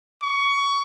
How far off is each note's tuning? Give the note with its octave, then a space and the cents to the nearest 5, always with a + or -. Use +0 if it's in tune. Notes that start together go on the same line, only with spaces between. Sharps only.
C#6 +20